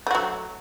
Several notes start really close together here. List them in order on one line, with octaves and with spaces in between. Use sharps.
A3 F#4 F#3